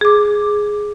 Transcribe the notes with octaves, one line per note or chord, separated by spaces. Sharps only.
G#4 D6